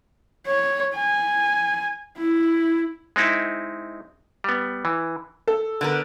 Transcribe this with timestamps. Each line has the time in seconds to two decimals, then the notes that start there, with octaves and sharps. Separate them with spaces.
0.47 C#5
0.96 G#5
2.18 E4
3.16 G#3 C4 D#4 E4
4.44 G3 B3
4.85 E3
5.48 A4
5.81 D3 B3 A#4